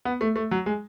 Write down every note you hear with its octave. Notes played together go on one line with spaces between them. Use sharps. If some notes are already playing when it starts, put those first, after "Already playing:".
B3
A3
A3
F#3
G#3